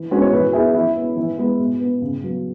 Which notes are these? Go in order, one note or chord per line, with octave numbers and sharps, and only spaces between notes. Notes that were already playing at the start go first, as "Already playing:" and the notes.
Already playing: E3
G#3 B3 C#4 F#4
C#5
E3 F#4 B4
B3 E4 G#4
E3 E4
B3
E3
G#3 B3
B2
B3
C#3
F#3 B3